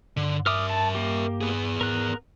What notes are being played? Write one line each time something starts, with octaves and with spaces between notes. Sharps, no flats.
G2 D3
A#4 E5 D6 D#6 F6
A5
A#3 G4
B3 G#4
G#2 A#4 F#6